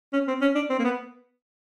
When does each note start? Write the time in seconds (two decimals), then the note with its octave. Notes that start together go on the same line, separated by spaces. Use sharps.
0.13 C#4
0.28 C4
0.42 C#4
0.55 D4
0.70 C4
0.79 A#3
0.84 B3